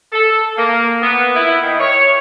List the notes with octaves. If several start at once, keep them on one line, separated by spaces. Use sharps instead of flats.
A4
A#3
B3
E4
D#3
C#5